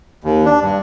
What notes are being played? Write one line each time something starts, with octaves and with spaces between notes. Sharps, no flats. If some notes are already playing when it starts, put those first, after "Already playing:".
D#2
D4
G2